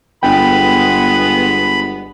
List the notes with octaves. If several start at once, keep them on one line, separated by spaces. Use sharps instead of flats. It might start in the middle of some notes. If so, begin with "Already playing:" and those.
G1 G#3 B3 G5 B5